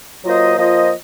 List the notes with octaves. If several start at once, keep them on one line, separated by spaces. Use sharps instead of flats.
F#3 A#3 F4 C5 D#5
F3 A#3 F4 C5 D#5